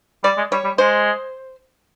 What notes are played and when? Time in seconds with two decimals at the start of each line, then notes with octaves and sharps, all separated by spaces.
0.24 G3 D5
0.37 G#3
0.52 G3 C#5
0.64 G3
0.78 G#3 C5